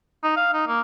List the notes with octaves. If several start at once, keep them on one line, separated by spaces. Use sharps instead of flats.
D#4
F5
D#4
A#3